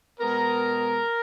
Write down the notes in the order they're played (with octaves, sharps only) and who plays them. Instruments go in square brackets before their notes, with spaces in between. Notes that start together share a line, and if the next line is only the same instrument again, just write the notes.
[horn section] B2 G#3 B3 A#4